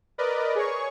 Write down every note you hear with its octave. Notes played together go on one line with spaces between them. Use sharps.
A#4 B4 D5 D#5
G#4 C#5 C#6